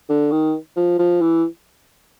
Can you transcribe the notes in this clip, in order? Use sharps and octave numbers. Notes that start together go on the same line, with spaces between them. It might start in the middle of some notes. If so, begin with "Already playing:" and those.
D3
D#3
F3
F3
E3